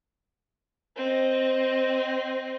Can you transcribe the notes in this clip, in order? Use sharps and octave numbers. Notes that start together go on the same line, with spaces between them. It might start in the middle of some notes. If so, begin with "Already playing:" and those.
C4 D#5